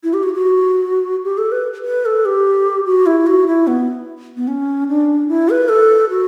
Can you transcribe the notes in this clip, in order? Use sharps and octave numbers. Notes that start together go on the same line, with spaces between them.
E4
G4
F#4
F#4
G4
A4
B4
B4
A4
G4
F#4
E4
F#4
E4
B3
B3
C#4
D4
E4
B4
A4
F#4